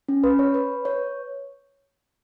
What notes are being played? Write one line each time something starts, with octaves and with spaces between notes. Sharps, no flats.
C#4
B4
C#5
B4
C#5